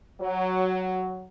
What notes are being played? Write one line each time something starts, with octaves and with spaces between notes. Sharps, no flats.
F#3